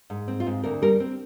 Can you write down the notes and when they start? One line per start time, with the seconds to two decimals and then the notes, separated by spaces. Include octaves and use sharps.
0.10 G#2
0.28 C4
0.40 F4
0.47 G#2
0.63 D2 A#4
0.82 G3 A#4
1.00 C4